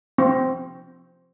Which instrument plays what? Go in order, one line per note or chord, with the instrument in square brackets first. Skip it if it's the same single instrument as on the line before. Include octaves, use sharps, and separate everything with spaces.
[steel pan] C4